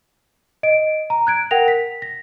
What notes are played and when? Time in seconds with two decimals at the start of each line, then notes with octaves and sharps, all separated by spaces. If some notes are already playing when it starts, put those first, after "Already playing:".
0.63 D#5 D7
1.10 A#5
1.27 F#6 G#6 D7
1.51 A#4 F#5 G5 A#6 F7
1.68 B6
2.02 A#6